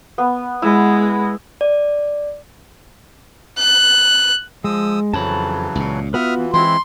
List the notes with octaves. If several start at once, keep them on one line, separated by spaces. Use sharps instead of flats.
B3
G#3 E4
D5
F#6
F3 G#3 D#6 E6
F2 C#3 E3 F#3 A5 B5
C#2 A#2
B3 F4 F#4 B4 E5 D#6 F6
E3
E3 G#3 C4 E4 C6